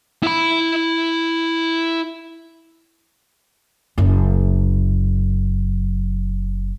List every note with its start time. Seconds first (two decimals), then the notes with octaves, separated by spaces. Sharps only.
0.23 E4 B5
3.98 F#1 F#2